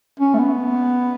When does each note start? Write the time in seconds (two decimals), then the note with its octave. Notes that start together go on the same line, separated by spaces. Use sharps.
0.20 C#4
0.34 A3
0.39 B3